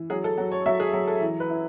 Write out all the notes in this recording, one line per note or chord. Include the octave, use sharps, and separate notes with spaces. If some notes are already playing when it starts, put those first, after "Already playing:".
Already playing: E3
F#3 G#4
A4
F#3
C#5
F#3 E5
G#4
F#3
A4
E3
B4
E4